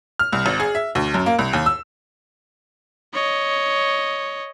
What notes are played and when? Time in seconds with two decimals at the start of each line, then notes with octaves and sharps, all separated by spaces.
0.19 F6
0.33 C2
0.46 G#1
0.60 G#4
0.75 E5
0.95 D2
1.14 F#2
1.26 A#3
1.39 C2
1.53 D#2
1.66 E6
3.14 C#5 D#5